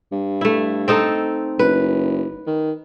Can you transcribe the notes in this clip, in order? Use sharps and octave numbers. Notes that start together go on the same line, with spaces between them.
G2
A3 E4
C4 D#4 A4
F#1 B4
D#3